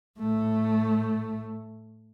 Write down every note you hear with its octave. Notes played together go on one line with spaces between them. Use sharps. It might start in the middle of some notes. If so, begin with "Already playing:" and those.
A2 A3